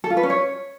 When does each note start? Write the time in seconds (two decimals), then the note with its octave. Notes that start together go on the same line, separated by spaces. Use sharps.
0.04 A4
0.10 F4
0.17 B4
0.23 C#4
0.30 C#5